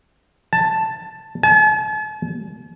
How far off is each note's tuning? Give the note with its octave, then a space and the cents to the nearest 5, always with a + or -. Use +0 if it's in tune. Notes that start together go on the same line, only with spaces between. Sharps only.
A5 +5
A5 -45